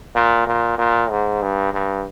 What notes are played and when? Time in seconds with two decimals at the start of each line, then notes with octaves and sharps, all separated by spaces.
0.15 A#2
0.47 A#2
0.78 A#2
1.10 G#2
1.42 G2
1.73 G2